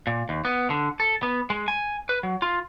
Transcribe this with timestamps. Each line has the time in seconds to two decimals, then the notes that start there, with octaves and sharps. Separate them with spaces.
0.07 A#2
0.29 D#2
0.45 B3
0.70 D3
1.00 A4
1.23 B3
1.50 G#3
1.68 G#5
2.09 B4
2.23 F#3
2.42 F4